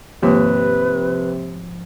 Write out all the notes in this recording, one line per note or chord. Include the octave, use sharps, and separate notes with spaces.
D#2 G#2 C3 F3 B4